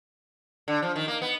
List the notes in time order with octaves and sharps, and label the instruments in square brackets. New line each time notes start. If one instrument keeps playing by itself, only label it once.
[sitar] D3
F3
D#3
A#3
B3